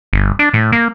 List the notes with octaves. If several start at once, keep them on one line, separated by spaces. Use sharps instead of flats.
G1
D4
A2
A#3